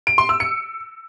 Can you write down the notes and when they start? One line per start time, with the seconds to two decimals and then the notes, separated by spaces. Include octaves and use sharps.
0.07 D7
0.18 C6
0.29 E6
0.40 C#7